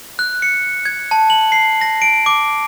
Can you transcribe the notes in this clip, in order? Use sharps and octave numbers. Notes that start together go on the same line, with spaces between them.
F#6
C#7
G#6
A5
F#7
C7
A#6
D7
D6